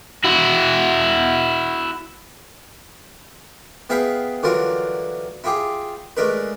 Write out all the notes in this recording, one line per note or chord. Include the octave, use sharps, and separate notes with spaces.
E4 F#4
B3 E4 G#4 F5 G5 B5
D3 E3 F#3 G3 F4 A#4
E4 F4 G4 G#4
G#3 A3 D4 A#4 B4